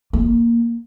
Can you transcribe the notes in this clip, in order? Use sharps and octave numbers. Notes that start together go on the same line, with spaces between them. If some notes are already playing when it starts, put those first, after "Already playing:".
A#3